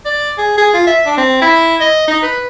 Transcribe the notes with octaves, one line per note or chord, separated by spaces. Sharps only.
D5
G#4
G#4
F4
E5
D4
C4
E4
D#5
D#4
B4